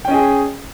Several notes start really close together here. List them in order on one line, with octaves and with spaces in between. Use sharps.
G5 C#4 D#5 G#4